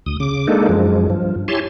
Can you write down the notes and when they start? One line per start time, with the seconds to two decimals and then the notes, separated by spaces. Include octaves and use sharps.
0.06 D2 D#6
0.20 C#3 D6
0.47 G#3 A#3 D4 D#4 A4
0.69 F#2 F3 G#3
1.10 G2 F3
1.48 E4 G4 C#5 G#5 A5 C6